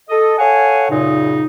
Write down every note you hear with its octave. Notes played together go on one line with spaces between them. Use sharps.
A4 D#5
A4 C#5 F5 F#5 G#5
F#2 A#2 C#3 D#4